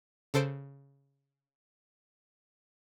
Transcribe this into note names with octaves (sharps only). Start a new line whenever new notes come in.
C#3 A4 C5 D7